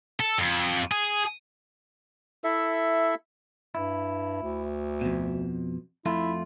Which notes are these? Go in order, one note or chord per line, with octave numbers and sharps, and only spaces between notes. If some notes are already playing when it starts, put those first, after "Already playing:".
A4
F2
G#4
E4 A4 E5
G2 E4
D2
F2 B2
F2 A3 E4 F4